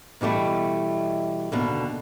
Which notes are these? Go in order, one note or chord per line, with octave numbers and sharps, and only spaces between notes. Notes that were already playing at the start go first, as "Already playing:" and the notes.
B2 E3 G3 A3
D#2 B2 D3